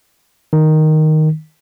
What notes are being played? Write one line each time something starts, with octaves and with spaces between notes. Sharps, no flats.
D#3